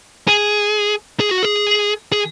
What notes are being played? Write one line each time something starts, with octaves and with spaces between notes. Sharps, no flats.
G#4
G#4
F#4
G#4
G#4